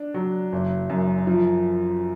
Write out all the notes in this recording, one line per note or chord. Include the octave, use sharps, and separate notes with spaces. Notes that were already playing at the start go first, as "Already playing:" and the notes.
Already playing: D4
F#3
F#1
F#2
F3